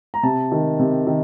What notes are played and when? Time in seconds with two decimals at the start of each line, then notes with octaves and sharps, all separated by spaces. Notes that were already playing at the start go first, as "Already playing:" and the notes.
0.14 A#5
0.23 C3 A5
0.52 D#3
0.79 C3
1.07 D#3